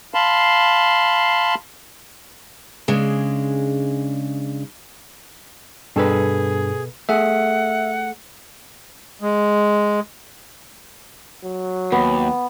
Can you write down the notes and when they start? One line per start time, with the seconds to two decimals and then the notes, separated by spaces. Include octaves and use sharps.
0.14 F5 A5 B5 C6
2.88 C#3 G#3 D4
5.96 G2 B2 G#4 A4 B4
7.09 A3 G#4 E5 F#5
9.21 G#3
11.44 F#3
11.92 D#2 B3